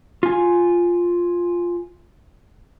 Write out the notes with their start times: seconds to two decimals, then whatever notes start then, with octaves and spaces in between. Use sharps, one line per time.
0.23 F4 G#5